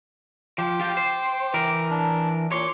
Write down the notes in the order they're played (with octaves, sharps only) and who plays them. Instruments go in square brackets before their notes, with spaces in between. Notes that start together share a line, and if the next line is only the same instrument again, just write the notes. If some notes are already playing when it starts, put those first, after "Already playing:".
[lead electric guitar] F3 [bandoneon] G5 D6
[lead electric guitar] F4 G4
C5
E3 A#4
[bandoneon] D4
[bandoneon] A#2 C6 D6 [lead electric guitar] C#5